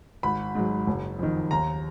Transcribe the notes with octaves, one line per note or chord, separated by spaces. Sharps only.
G#1 B5
G#2 F#3
F#1
F2 D#3
D#2 A#5